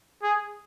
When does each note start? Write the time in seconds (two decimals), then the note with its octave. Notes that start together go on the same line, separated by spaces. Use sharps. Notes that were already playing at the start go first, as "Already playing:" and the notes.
0.23 G#4